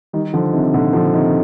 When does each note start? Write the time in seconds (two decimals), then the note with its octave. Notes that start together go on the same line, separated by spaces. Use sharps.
0.13 D#3 G3
0.34 D3 F3
0.53 C3 D#3
0.74 A#2 D3
0.93 D3 F3
1.14 C3 D#3